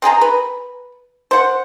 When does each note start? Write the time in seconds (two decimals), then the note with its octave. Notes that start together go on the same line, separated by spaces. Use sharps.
0.02 C4 G#4 G5 A#5
0.21 B4
1.31 C5 F#5